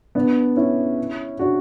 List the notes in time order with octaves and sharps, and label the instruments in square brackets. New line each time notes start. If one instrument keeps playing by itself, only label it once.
[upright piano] B3 D4
C#4 E4
D4 F#4